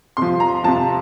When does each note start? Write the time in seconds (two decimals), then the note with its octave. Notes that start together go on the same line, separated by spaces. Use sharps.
0.17 C3 F3 C6
0.40 A#5
0.64 C3 F3 A5